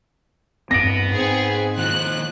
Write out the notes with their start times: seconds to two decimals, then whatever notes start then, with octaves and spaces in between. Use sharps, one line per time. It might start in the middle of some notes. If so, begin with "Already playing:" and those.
0.71 G2 B3 C4 A#6 D7
1.11 G#2 C4 G#4
1.78 D#2 F3 F#6